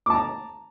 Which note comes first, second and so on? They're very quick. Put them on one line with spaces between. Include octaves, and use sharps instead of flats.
D6 A5 A#5